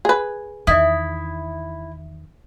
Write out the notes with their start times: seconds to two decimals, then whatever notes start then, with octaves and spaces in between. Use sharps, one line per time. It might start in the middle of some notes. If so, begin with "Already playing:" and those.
0.05 G#4 B4
0.67 E2 D#3 E4 E5 D#6